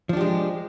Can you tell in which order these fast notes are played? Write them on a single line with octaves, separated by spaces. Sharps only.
F3 D4 G4 G#3